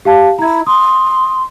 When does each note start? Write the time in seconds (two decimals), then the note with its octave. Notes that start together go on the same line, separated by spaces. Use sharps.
0.05 G4 F5 A5
0.39 E4 A#5 G#6
0.67 C6 D#6